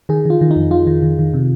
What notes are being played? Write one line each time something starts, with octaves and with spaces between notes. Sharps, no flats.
D#3 G#4
D#3 F4
D#3
D#4
F2
D#3 F4
D#3
D#3
D#3
C3